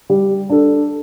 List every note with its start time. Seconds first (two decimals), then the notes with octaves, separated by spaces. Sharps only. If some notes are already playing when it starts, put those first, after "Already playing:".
0.10 G3
0.50 D4 A4